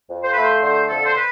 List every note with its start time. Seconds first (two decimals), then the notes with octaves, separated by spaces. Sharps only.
0.08 F2
0.22 C5
0.32 A3 B4
0.42 C5
0.62 D3 C5
0.89 F2 A4
1.05 C5
1.16 B4